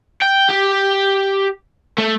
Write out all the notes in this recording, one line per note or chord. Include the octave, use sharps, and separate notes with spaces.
G5
G4
A3